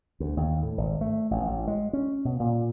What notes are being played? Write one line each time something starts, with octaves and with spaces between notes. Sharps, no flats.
D2
D#2
A2
G#1
A3
A1
A1
G#3
C#4
B2
A#2